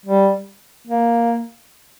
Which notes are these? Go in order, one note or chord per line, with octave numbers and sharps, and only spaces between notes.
G3
A#3